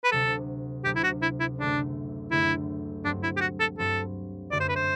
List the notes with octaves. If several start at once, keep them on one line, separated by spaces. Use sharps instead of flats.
B4
D2 C3 F#3 A4
D2 C3 F#3 G4
E4
F#4
E4
E4
F#1 F#2 D3 A3 D4
F#1 F#2 D3 A3 E4
G2 F#3 C4 D4
E4
G4
F#4
A4
G2 F#3 C4 A4
F#2 D3 A3 D4 F#4 D5
C5
B4
C5